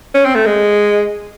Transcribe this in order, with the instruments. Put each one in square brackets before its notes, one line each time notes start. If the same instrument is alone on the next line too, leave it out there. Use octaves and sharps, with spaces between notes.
[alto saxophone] C#4
C4
A3
G#3